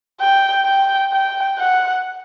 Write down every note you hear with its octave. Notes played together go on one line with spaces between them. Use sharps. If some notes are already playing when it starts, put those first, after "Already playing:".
G5
G5
G5
F#5